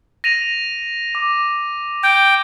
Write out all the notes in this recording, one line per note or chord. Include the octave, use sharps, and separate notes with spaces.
A#6 D#7 F7
D6
G5 G6